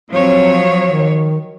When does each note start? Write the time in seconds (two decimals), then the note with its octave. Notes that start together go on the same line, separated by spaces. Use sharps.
0.10 F3 F#3 C4 C#5
0.86 D#3